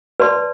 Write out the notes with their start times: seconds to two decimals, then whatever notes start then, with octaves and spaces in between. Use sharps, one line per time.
0.20 B4 D5 A5 C6